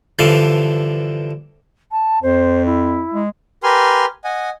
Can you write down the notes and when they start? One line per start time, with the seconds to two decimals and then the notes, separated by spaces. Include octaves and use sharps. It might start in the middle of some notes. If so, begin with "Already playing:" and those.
0.19 G2 D3 E3 F3 F5
1.91 A5
2.23 F2 C5
2.66 E4
3.14 G#3
3.63 G4 A#4 B4 G#5 C6 F6
4.24 D#5 F#5 G#5